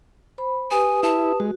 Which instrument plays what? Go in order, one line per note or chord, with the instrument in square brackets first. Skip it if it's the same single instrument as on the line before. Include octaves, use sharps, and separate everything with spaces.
[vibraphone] C5 B5
[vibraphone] G4 B4 D#6 [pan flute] G#5
[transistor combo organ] E4 [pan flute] A5
[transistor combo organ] G#3 [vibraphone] F#4